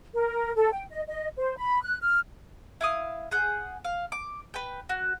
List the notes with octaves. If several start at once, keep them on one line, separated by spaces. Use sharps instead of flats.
A#4
A4
G5
D#5
D#5
C5
B5
F#6
F6
E4 F5 D#6
G#4 F#5 G6
F5
D6
B4 G5
F#4